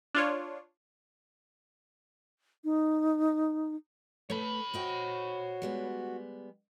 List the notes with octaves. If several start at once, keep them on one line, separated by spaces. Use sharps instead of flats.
D4 F4 C#5
D#4
A3 B4 C#5 B5
F#4 C5 D#5 G5
G3 G#3 B3